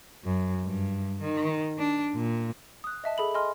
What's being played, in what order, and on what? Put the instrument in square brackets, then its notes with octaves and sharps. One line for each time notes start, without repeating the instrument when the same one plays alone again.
[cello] F#2
G2
D#3
D4
A#2
[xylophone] D#6 F#6
D#5 E5 A5
G#4 A4 B5 F#7
D#5 G#5 C6 F6